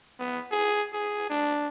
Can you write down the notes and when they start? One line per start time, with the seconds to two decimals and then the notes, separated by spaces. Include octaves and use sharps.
0.19 B3
0.51 G#4
0.93 G#4
1.30 D4